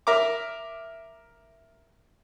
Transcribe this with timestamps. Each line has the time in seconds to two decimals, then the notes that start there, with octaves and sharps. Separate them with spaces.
0.07 A#4 E5 A#5 D6